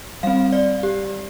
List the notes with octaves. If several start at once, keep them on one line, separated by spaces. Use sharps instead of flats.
G3 C4 F5
D5
G4